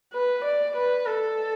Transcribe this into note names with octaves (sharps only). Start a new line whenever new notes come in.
B4
D5
B4
A4